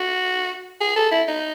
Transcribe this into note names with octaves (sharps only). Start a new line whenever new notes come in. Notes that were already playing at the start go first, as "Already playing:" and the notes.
Already playing: F#4
G#4
A4
E4
D#4